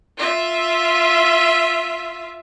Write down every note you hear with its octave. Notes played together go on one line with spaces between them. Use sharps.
F4 E5